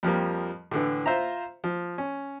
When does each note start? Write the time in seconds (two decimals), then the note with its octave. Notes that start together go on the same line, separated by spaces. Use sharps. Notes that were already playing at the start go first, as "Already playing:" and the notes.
0.03 F2 F3 G3 A#3
0.71 A2 D3 E3
1.06 F4 C5 E5 A#5
1.64 F3
1.98 C#4